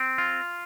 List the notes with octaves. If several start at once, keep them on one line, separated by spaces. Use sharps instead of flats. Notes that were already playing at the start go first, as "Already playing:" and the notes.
Already playing: C4
F4